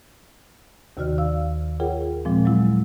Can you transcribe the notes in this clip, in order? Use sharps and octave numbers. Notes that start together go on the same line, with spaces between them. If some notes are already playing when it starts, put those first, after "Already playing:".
D#2 C3 D#3 F#4 D5 F6
D5 F5 E6
F4 G#4 A#4 C#5 F#5 G5
A#2 F3 G#3 C4
F#3 G#3 E4